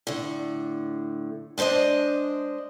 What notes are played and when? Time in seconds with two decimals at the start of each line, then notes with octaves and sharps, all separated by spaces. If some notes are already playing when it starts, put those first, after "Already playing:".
0.07 A2 D3
1.58 G#3 D4 C5 D5 D#5